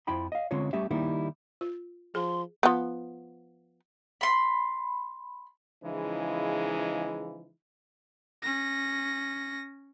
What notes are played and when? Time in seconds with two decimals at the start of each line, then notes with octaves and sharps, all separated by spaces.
0.07 F2 F3 E4 G5 B5 C6
0.32 D#5 F5
0.51 D3 G#3 C4 C#4 F4 C#5
0.73 G3 A3 C#4 G4 E5
0.91 D#3 G3 A#3 D#4 E4
1.61 F4
2.15 F3 G#4 C6
2.63 F3 B3
4.21 B5 C6
5.83 C#3 E3 F3 G#3 D#4 E4
8.42 C#4 A#6